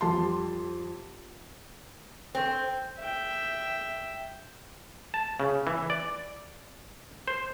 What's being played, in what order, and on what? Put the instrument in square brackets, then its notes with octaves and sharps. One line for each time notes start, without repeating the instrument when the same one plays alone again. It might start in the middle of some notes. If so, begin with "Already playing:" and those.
[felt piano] F2 G3 A5 C6
[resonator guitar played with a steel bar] C4
[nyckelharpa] E5 G5
[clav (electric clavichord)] A5
C#3
E3
D5
C5